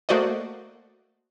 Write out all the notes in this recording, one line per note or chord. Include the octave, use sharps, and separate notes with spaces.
A3 A#3 F#4 C5 D5 D#5